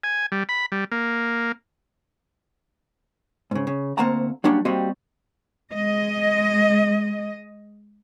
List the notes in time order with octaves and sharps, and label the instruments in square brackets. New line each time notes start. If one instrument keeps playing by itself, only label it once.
[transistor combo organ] G#5
G3
B5
G3
A#3
[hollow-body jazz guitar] G#2 C#3
C#3
D2 A#3 C4 F#5 A5 A#5
F#3 G3 A#3 C#4 D4 F#4
G3 A#3 C4 F#4 D#5
[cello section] G#3 D#5